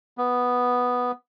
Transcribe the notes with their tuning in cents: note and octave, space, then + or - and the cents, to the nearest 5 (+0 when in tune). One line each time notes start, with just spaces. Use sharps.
B3 +0